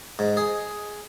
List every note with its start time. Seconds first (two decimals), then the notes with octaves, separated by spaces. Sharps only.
0.19 G#2
0.37 G#4